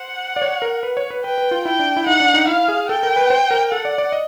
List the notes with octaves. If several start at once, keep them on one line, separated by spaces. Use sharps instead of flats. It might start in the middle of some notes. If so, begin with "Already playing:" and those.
Already playing: C5 F#5
D5
C#5
A#4
B4
C#5
B4
B4 G5
B4
F4
E4 G5
D4
E4
D#4 F#5
D4
D#4
E4 F5
G#4
A4 G5
A#4
B4
C5
A#4
A4 F#5
D5
D5
D#5